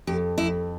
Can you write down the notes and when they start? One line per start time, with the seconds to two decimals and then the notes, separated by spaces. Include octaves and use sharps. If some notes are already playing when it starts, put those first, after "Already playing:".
0.07 F2 G4
0.38 F2 E4